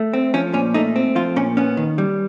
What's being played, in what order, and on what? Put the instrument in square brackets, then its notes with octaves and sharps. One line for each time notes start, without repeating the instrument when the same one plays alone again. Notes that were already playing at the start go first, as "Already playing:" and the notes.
Already playing: [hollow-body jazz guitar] A3
C4
F3 C#4
A#2 C#4
A3 D#4
C4
F3 F4
A#2 C#4
B3 C#4
D#3
G3